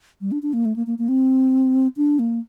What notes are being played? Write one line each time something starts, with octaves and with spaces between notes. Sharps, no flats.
G3
D4
D4
A#3
A3
A#3
A#3
A#3
C4
D4
A#3